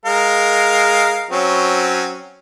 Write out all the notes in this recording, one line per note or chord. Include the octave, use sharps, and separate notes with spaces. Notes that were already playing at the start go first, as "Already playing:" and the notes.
G#3 A#4 F5
F#3 C4 C#4